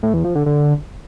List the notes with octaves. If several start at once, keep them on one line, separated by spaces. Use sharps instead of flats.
A2
E2
F3
D3
D3